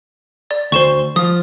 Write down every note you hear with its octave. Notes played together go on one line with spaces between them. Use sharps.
D5
D2 C5 C#6 E7 G7
F3 F4 D#6